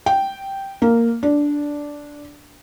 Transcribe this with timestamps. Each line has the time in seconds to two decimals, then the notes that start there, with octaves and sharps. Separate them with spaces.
0.06 G5
0.82 A#3
1.23 D4